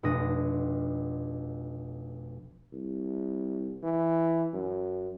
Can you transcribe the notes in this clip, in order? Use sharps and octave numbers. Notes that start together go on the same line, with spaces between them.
F1 B1 D4 D#6 A#6
C2
E3
F#2